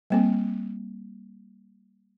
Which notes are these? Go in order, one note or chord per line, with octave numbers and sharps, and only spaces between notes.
G3 A#3 C4